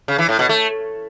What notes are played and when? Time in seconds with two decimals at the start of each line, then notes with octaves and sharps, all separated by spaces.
0.08 C#3
0.18 E3
0.29 A2
0.39 B2
0.49 A3